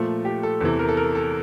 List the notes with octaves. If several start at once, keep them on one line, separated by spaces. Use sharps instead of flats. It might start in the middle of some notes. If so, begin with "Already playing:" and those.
Already playing: A#2 F3 A3
G4
A4
E2 C3 E3 A4
A#4
A4
A#4
A4